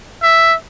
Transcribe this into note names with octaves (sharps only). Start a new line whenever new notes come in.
E5